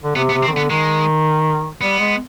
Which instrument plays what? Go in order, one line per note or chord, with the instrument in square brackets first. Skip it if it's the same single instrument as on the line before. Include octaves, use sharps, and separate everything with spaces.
[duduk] D3
[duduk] C3 [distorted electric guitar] B3
[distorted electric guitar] B3
[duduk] C3
[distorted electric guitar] C4
[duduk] D#3
[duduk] D3 [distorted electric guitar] B3
[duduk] D#3 [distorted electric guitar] G#3
[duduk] G3 [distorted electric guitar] B3
[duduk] G#3